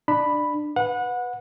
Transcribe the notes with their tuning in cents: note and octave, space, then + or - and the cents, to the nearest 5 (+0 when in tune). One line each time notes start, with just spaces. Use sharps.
D4 +25 B5 +0
B4 +0 F#5 -25